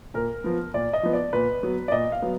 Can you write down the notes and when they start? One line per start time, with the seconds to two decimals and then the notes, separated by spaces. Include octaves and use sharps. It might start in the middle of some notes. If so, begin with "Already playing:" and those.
0.14 A#2 A#4
0.44 F3 B3
0.74 A#2 D5
0.93 D#5
1.03 F3 B3
1.13 D5
1.33 A#2 B4
1.63 F#3 B3
1.88 D5
1.92 A#2 D#5
2.12 F5
2.22 F#3 B3